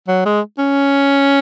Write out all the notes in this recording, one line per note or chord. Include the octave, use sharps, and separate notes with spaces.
F#3
G#3
C#4